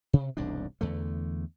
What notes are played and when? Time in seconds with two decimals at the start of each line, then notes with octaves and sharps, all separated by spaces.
0.13 C3
0.37 E1 C2 G#2 D4
0.81 E2 D3 A3